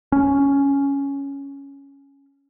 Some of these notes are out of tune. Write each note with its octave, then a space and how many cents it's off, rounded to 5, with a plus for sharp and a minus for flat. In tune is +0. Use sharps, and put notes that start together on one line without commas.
C#4 +5